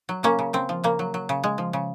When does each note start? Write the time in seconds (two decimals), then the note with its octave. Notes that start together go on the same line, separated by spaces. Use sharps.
0.09 F#3
0.23 C#3 A#3 C#4
0.39 C#3
0.53 C#3 C4
0.69 F3
0.84 C#3 A#3
0.99 F#3
1.14 F#3
1.29 C#3
1.44 G#3
1.58 F3
1.73 C#3